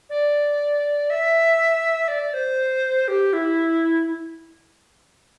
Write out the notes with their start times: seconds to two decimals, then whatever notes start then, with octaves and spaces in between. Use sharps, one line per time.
0.10 D5
1.10 E5
2.08 D5
2.34 C5
3.08 G4
3.33 E4